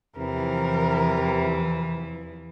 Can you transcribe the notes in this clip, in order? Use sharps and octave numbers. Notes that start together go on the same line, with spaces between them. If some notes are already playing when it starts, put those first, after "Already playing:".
E2 C3 E3 F3 A#4